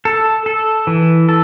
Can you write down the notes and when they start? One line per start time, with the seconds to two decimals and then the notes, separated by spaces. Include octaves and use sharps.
0.05 A4
0.46 A4
0.87 E3
1.29 A4